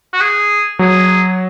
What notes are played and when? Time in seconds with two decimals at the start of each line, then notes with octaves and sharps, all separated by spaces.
0.13 F#4
0.21 G#4
0.79 F#3 G#4